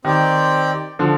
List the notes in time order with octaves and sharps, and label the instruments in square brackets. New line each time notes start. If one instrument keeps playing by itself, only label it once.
[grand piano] D#3 [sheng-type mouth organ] C4 G4 D5 G5
[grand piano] D3 F3